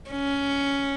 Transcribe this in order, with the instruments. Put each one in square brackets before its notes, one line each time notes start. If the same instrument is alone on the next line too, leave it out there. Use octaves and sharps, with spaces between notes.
[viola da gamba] C#4